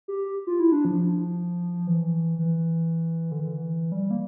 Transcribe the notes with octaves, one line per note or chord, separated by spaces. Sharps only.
G4
F4
E4
D4
F3
E3
E3
D3
E3
G3
A#3